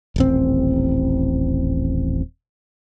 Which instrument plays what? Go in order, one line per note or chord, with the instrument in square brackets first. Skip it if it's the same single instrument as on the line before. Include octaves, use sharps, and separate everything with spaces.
[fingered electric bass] D#1 A1 C4